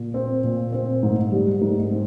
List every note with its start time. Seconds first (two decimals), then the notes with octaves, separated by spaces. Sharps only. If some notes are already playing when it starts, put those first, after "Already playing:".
Already playing: A#2
0.14 C4
0.44 A#2
0.73 C4
1.03 G#2
1.32 G3
1.61 G#2
1.91 C4